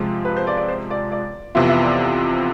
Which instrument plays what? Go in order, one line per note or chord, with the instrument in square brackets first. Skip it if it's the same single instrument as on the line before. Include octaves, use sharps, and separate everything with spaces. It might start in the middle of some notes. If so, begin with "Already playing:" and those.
Already playing: [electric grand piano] C3 F3 G#3 [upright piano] F4
[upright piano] B4
C5
D5
D5
C5
D5
D5
[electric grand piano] F2 C3 E3 B3 F4 [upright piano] E5
[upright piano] E5
D5